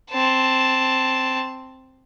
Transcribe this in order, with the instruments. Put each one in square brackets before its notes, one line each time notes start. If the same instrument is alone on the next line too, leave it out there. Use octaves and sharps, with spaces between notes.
[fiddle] C4 A5